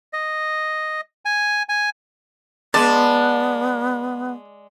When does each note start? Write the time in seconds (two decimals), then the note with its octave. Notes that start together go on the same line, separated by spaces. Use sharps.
0.13 D#5
1.25 G#5
1.69 G#5
2.74 G#3 B3 D5 A5